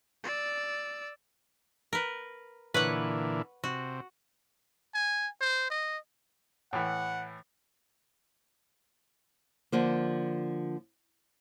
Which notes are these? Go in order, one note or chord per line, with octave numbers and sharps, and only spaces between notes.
D5 E6
A#4 B4
A#2 D3 E3 B4 C#5 F#5
C3 F#4
G#5
C5
D#5
A2 E3 F#5
D3 F3 A#3